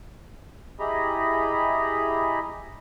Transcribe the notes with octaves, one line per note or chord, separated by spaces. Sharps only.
E4 G4 G#4 D#5 A#5 B5